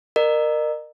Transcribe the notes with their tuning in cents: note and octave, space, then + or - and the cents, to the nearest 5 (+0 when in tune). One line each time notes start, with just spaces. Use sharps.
A#4 +0 D#5 -45